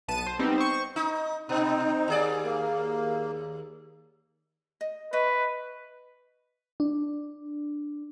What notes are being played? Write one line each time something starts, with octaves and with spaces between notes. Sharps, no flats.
B1 B3 A5 D#7
C5
G3 B3 C4 D#4
C5 C#6
D#4
B2 C4 D#4
D#2 G#4 D5
A#3
D#5
B4 D#5 E5 C#6
D4